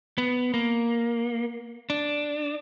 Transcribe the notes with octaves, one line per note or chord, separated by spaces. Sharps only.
B3
A#3
D4